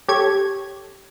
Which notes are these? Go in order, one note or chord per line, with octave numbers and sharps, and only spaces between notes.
G4 A4 C#5 G#6